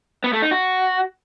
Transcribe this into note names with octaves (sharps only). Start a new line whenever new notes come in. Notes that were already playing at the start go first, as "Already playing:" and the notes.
B3
A3
D#4
F#4